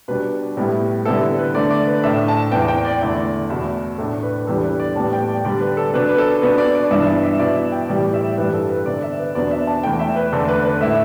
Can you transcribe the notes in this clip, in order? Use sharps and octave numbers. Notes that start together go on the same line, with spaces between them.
B2 G3 D4 B4
A2 G3 B3 E4
D3 G3 B3 E4 A4
A4
B4
D3 A3 D4 D5
D5
B4
A2 A3 D4 E5
A5
E2 E3 B3 G5
G5
D5
E2 D3 A3 E4
E2 B2 A3 E5
A2 A3 D4 A4
B4
E2 E3 G3 B3 D4 A4
B4
D5
A2 G3 B3 A5
G5
D5
D3 G3 D4 D5
B4
A4
B2 B3 D4 B4
B4
A4
B2 B3 D4 B4
D5
D5
G2 E3 B3 D4 E5
E5
B2 B3 E4 D5
E5
G5
A2 E3 G3 D5
D5
E5
D5
G2 E3 G3 B4
A4
B4
D3 B3 D4 D5
E5
B4
E2 B2 B3 D4 D5
E5
A5
E2 E3 A3 E4 G5
E5
B4
E2 D3 A3 D4 A4
B4
B4
A2 A3 E4 E5